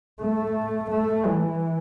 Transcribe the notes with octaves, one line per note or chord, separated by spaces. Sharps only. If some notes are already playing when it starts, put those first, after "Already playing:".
A3
A3
E3